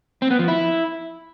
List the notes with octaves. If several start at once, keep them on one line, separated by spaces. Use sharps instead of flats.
C4
B3
F3
E4